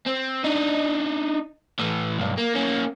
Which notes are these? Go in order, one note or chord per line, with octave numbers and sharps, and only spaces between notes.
C4
D4 D#4
A2 E3
B1 G2
A#3
A#3 C#4